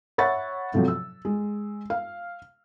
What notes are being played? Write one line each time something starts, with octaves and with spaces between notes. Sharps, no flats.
C#5 E5 F#5 B5 C#6 A6
A2 C3 F3 F#3
E6
G#3
F5